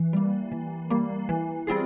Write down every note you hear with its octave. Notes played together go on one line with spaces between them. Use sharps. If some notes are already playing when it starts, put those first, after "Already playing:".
Already playing: E3
G3 A#3
E3
G3 A#3
E3
G3 C4 F4 G#4